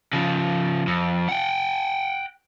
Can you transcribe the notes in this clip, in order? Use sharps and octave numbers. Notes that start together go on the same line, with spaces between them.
C#3 F3
F2
F#5 G5